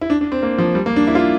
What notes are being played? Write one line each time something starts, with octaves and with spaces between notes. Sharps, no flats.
E4
D4
D4
C4
A#3
F3
G3
A#3
D4
E4
F4